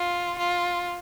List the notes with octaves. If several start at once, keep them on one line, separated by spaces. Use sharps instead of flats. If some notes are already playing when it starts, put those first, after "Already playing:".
Already playing: F4
F4